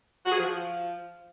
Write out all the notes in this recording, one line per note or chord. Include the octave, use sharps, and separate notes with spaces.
F#4
G#4
F3